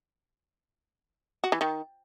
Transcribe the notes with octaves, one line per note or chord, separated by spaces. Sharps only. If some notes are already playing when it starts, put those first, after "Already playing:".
F#4
E3
D#3